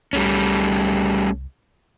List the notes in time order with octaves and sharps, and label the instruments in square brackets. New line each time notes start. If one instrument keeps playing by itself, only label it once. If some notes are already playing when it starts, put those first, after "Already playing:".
[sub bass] C2 [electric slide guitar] G3 A3 C#4